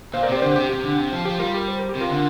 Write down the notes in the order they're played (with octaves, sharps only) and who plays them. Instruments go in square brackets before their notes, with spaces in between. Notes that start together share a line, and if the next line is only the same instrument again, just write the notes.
[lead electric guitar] A#2 [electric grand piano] C5 F5
[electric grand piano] A#4 D5
[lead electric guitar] C3 [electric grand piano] G4 C5
[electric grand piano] D5
[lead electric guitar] D3 [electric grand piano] G4 C5
[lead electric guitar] C3 [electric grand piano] G4
[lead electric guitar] C3 [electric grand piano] G4
[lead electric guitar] D3
C3
F3
[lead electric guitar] F3 [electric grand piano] G4
[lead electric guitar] G3 [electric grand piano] F4 A#4
[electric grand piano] G4
C5
A#4
G4
[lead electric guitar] C3
[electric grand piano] F4 A#4
[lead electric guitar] D3